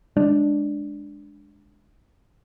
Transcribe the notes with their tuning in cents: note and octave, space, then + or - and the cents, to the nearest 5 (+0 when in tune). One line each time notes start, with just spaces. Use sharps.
G#3 +0 D4 +0